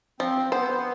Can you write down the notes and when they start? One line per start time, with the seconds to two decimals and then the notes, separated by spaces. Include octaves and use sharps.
0.20 F3 C4
0.52 B3 C5